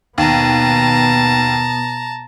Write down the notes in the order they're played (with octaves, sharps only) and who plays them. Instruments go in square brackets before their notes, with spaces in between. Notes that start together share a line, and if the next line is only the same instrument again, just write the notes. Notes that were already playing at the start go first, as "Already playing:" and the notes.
[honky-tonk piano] D#2 [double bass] B2 B3 [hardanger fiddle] A5 A#5